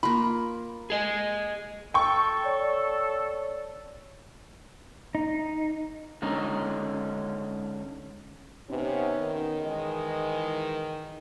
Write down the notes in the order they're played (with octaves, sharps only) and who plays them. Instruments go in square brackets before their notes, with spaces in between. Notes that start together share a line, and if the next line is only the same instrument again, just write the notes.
[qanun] A#3 F4 [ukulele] B5
[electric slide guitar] G#4 D#5
[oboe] A4 [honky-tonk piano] G5 C#6
[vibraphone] C#5 D5
[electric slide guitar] D#4
D3 G#3 C#4 D#4
[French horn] C3 [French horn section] B3 C#4 D#4
[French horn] D#3
[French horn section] E3 G#3 D#5